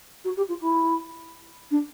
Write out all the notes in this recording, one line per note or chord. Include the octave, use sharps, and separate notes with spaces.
F#4
G4
F4
E4
D4